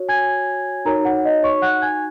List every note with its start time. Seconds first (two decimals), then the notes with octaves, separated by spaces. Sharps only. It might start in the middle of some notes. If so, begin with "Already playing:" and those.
Already playing: F#4 C#5
0.09 G#5 G#6
0.85 D#4 F#4 A#4 C#5 A#5
1.05 F#5
1.25 D#5
1.43 C#5 C#6
1.62 F#5 F#6
1.82 G#5 G#6